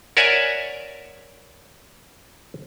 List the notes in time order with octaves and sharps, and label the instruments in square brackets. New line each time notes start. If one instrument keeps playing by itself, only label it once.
[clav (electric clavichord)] A#4 C#5 D5 E5 F#5 G#5